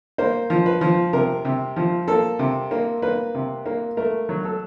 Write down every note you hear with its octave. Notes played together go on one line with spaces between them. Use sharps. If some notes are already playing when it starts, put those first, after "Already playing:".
A#3 C5
F3
B4
F3
C3 A#4
C3
F3
A#3 A4
C3
A#3
A#3 B4
C3
A#3
A3 A#4
F#3
A4